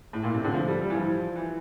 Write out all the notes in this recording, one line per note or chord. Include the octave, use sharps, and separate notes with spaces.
A2
A#2
C3
D3
F3
G3
G3
E3
F3
E3